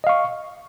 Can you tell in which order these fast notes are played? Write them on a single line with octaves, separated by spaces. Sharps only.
D#5 F5 C#6